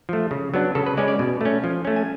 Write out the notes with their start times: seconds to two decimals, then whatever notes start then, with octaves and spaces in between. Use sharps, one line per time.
0.09 F3 A3
0.31 C#3
0.54 F#3 B3 D4
0.75 C#3 A4
0.86 B4
0.97 G#3 C#4 D5
1.08 D5
1.19 B2
1.41 A3 C#4
1.64 F3
1.85 A3 C#4
1.96 G#5